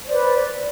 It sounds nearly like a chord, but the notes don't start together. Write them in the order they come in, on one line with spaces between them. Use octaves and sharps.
C5 D5 B4